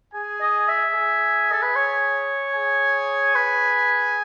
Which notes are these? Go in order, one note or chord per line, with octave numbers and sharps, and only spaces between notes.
G#4 G#5
D#5
E5
G#4 G#5
A4
B4
C#5
G#4 G#5
B4